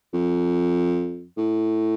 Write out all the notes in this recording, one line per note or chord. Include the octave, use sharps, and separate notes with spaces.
F2
A2